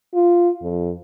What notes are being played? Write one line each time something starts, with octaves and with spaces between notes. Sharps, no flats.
F4
F2